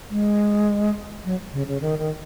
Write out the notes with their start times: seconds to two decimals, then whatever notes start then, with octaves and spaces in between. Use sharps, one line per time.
0.10 G#3
1.25 F#3
1.53 C#3
1.68 C#3
1.82 D#3
1.99 D#3